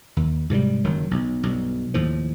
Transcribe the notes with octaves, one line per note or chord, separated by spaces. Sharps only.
D#2
G#2 C3 D#3 G3
F#1 D#3 F#3
B1
B1 G2
D#2 A2 F3